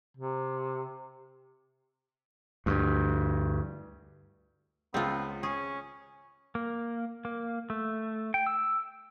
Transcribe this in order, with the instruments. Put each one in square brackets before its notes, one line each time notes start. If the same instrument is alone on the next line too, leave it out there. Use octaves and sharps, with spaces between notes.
[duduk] C3
[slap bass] D2 G2
[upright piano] C#2 [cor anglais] B3 [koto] C4 F4
[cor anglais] C#4 [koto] G#4
[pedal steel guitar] A#3
A#3
A3
G5
E6